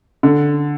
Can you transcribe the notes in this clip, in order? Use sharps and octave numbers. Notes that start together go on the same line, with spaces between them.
D3